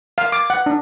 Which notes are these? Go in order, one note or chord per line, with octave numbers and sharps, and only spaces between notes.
F5
D6
F#5
D4